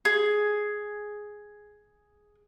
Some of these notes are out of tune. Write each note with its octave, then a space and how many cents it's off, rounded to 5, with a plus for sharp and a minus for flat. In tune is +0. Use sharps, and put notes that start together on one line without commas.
G#4 +5